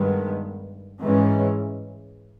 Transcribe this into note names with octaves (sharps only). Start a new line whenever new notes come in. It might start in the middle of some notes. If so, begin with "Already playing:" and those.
Already playing: G2 D#3 G#3 B3
G#2 E3 G#3 C#4